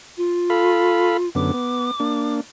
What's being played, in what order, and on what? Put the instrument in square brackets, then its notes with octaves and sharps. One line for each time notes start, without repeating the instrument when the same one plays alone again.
[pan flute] F4
[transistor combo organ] A4 F5 B5
[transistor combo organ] F#2 D3 B3 [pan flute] D6
[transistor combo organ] B3
A#3 D4